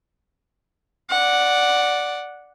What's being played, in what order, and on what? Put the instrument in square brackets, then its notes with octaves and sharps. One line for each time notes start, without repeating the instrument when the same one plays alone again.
[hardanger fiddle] D5 F#5